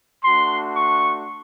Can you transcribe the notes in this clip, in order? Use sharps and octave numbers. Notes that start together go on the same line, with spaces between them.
A3 D4 F#4 C6
C#6